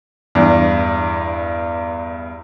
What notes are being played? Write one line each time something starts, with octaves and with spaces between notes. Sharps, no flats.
E2 G2